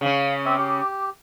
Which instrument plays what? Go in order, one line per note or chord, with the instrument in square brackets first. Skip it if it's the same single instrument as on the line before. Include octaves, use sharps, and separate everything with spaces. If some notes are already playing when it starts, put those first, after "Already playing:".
[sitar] C#3 C#4 [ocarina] F5
[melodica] C4 E5 [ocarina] D6
[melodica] G4